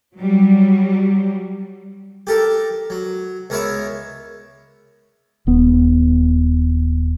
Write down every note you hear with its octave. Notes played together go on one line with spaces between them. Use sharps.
F#3 G3
G4 A4 A#4
F#3
C#2 B3 A#4 C#5 E5
D#1 B3